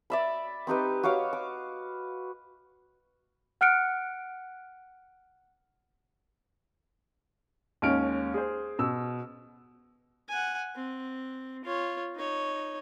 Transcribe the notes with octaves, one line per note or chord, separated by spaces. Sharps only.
D5 E5 B5
C4 D#4 G4 B4
F#4 C#5 F5 D6
D6
F#5 F6 F#6 C#7 D7
D#2 G#3 C#4 F6 D7
G#4 C5
B2 E6
F#5 G#5
C4
F4 C#5
D#4 C#5